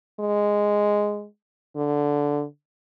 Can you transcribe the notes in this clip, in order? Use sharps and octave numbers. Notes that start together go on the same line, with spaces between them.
G#3
D3